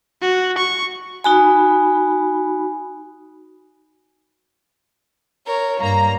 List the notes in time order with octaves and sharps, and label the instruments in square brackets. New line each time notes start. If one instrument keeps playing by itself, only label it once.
[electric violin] F#4
C#6
[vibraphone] D#4 F#4 B5 [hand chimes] G#5
[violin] A#4 C#5
[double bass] G2 [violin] A#3 [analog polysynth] A#5